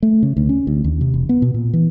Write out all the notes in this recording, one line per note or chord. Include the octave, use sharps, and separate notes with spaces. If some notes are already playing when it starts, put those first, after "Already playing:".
A3
C#3
D2
C#4
D2
D#2
C3
E1
B3
B2
A#2
E3